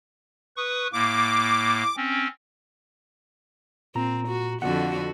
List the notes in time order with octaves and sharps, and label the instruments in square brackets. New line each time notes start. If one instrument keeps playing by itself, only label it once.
[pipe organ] B4 C#6 D#6
[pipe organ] A2 A#3 [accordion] D6
[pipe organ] C4 C#4
[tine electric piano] A#2 A#5 [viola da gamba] C4
[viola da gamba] F#4
[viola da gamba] F2 D3 F#4 [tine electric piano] F#5